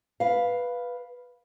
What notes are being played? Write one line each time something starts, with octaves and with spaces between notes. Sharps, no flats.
B4 F5